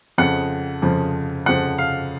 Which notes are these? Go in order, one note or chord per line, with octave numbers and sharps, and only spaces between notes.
F2 C#3 F3 F#5
F2 C#3 F3
F2 C#3 F3 F#5
F5